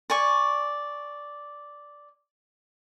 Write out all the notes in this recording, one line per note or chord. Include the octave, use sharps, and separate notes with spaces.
D5 G#5 C#6